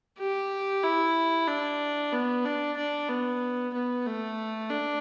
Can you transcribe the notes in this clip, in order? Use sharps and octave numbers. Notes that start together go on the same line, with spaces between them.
G4
E4
D4
B3
D4
D4
B3
B3
A3
D4